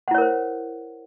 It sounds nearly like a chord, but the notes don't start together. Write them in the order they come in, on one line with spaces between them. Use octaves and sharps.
F#5 E4 C#5 A#4 C5